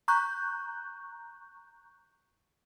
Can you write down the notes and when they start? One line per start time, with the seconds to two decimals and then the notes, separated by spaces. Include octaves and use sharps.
0.08 A#5 C#6 F#6 G6